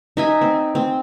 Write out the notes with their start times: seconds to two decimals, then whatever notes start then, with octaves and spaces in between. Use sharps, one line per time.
0.17 D#4 E5 G#5
0.41 C4
0.75 C4